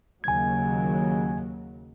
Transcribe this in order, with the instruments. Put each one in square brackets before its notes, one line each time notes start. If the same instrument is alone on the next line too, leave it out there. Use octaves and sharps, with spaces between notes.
[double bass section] D#2 C#3 F#3 [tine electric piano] G#5 G#6